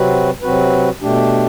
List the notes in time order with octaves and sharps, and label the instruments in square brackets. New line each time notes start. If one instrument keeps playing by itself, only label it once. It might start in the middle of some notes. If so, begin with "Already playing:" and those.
Already playing: [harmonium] C3 F#3 C4 F#4 B4
C3 F#3 C4 F#4 B4
B2 A3 D4 G4